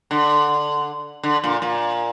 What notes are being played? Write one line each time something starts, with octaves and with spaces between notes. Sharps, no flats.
D3
D3
A#2
A#2